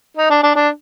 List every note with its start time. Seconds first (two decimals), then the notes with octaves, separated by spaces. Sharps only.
0.17 D#4
0.30 D4
0.43 D4
0.55 D4